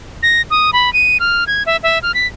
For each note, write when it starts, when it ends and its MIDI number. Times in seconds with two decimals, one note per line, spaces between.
0.23 0.42 94
0.50 0.71 87
0.73 0.92 83
0.93 1.18 99
1.20 1.44 89
1.47 1.63 92
1.66 1.77 76
1.83 1.99 76
2.03 2.14 89
2.14 2.27 95